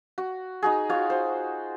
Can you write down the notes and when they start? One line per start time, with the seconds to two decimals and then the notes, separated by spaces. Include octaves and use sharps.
0.18 F#4
0.62 D#4 F#4 G#4
0.89 F4 F#4 C#5
1.10 C5